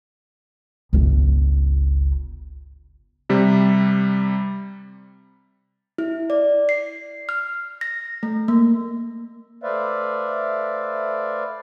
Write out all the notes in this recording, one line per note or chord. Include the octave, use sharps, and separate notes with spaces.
G1 C#2
C3 G3
E4
D5
C7
F6
A#6
A3
A#3
A3 B4 C5 D5 E5 F5